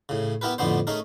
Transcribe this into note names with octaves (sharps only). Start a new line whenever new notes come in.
A2 C#3
B3 E4 G4 A#4 B4
F2 A2 D3 B3 D4 C5
A3 C#4 D#4 G#4 A#4